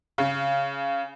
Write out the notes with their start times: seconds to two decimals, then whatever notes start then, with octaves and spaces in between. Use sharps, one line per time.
0.18 C#3